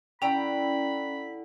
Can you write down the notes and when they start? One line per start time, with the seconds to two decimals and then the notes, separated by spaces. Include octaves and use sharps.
0.22 D3 C#4 E4 G5 A#5 B5